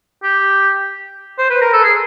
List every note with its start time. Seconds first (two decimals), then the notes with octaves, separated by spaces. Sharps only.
0.23 G4
1.38 C5
1.50 B4
1.61 A#4
1.73 A4
1.84 G#4